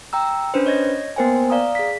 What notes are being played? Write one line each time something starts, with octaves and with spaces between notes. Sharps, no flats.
G5 A#5 E6
C#4 D4 B4 C5
C#5 D#5 G#6 A#6
A#3 B3 A#4 C5 G5 G#5
D5 F5 A#5 D#6
G#4 B6